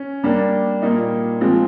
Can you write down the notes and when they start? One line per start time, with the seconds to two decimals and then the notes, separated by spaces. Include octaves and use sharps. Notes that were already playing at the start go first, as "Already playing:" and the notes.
Already playing: C#4
0.24 G3 A#3 D4
0.82 A#2 G3 A#3 D#4
1.41 F3 G#3 C4 F4